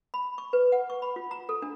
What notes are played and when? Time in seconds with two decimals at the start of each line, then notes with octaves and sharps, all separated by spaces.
0.14 B5
0.38 C#6
0.53 B4
0.72 F#5
0.90 C#6
1.02 B5
1.16 F4
1.31 A#5
1.49 A4
1.62 D4